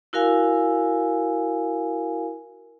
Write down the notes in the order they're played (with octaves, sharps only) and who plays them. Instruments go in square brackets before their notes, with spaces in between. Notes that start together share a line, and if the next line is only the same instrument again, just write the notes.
[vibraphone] E4 F#4 A#4 F5 G#5